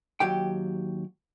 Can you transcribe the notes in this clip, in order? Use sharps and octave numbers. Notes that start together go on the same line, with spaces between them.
D#2 F#3 G4 G5